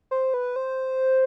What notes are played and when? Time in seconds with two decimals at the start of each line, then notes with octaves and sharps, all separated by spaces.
0.11 C5
0.34 B4
0.56 C5